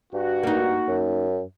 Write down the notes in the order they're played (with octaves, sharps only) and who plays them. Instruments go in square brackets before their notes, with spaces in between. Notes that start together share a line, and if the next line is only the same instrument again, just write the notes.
[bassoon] G2 [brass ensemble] F#4
[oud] A#3 D#4
[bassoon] F#2